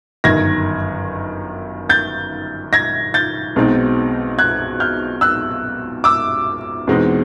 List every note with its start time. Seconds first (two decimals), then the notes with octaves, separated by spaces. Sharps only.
0.24 G1 F#2 D#3 G#6 A#6
1.89 G6 A6
2.73 G#6 A#6
3.14 G6 A6
3.56 B1 B2 G#3 C4 D#4
4.39 F#6 G#6
4.80 F6 G6
5.21 E6 F#6
6.04 D6 E6
6.87 E2 B2 G#3 C4 D#4